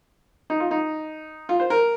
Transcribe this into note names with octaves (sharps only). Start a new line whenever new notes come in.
D#4
F4
D#4
F4
C5
A#4